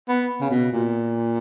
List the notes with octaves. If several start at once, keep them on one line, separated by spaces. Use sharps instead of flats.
B3
C#3
B2
A#2